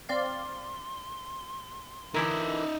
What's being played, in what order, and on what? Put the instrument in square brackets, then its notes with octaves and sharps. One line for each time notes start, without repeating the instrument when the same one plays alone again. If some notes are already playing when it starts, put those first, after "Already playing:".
[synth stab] C4 D5 F5 [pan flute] C6
[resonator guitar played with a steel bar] D3 E3 A#4 [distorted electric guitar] D#4 E5